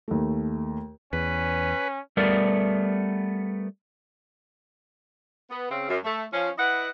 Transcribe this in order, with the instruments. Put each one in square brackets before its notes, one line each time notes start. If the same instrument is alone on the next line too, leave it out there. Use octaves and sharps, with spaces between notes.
[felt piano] D#2 A3
[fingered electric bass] E2 [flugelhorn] C#4 [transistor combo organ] B4
[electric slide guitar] G3 A3 B3 A#4 D5
[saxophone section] B3
C#3 C4
F#2
A3
F3 C#4
E4 B4 D#5 F#5